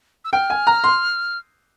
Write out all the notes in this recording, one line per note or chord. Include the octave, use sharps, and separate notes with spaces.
E6
G5 F6
G#5
A#5
C6